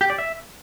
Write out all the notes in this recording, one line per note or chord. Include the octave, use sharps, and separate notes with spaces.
G4
D5
E5